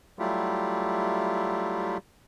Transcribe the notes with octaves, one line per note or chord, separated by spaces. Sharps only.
F#3 G3 A3 E4 F4 G4